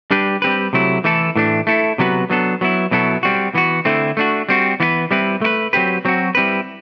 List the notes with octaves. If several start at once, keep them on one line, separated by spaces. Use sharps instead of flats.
G3 D4 G4 B4
G3 C4 G4 B4
C3 F#3 A3 E4
E3 A3 E4 A4
A2 E3 A3 D4
A3 E4 A4
C3 F#3 B3 F#4 B4
F#3 B3 D4 A4
F#3 B3 E4
B2 F#3 B3 E4 A4
G3 C4 F#4
E3 B3 F#4
D3 A3 C4 E4
A3 D4 F#4
G3 C4 F#4
E3 B3 E4 B4
G3 C4 E4 B4
A3 E4 B4
F#3 C4 G4 B4
F#3 C4 F#4
G3 C4 E4 B4